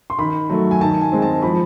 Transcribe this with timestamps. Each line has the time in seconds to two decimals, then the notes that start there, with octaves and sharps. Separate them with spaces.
0.10 C6
0.19 D#3 B5
0.50 F#3 A3
0.71 G#5
0.81 D#3 A5
1.01 G#5
1.12 G#3 C4
1.22 A5
1.42 F3 B5